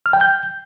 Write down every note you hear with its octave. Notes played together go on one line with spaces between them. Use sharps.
F6
G5
G6